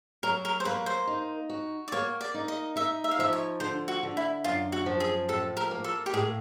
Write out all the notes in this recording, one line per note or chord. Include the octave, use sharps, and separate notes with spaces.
F#3 A#4
A#4
C5
A#3 B4
C5
D#4
F#4
D5
A#3 C#5
D5
D#4
D#5
D#4 E5
E5
F5
F3 E5
C#5
D3 C5
F#4
D3
E4
F#2 F4
F#4
F3
G#4
A2 A4
A#4
A#3
A4
G4
A2 G#4